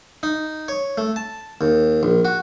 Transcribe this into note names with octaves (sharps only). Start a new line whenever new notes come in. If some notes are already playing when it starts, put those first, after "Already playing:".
D#4
C#5
A3
A5
D#2
A#1
F#4